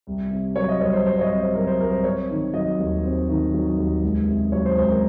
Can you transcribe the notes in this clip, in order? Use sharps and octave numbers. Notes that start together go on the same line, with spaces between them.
C2
C3
F#3 C#5
D#5
C2 C#5
C5
C2 C5
C#5
D#5
C3
C5
F#3 A#4
C5
C2 A#4
C5
C4 C#5
D#3
F#3 D#5
D#2
C4
D#3
F#3
D#2
C#2
C3
F#3 C#5
C5
C#2 C5
A#4